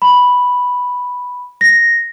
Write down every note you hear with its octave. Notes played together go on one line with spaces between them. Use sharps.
B5
A#6